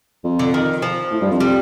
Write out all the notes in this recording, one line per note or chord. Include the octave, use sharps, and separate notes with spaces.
F2
D3
D#3
F3
A2
G2
F2
G3